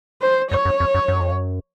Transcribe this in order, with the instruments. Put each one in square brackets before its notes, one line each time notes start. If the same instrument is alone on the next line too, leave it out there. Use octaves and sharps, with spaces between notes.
[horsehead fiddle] C5
[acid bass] F#2 [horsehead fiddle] C#5
[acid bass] F#2
F2
F#2
F#2
F2
F#2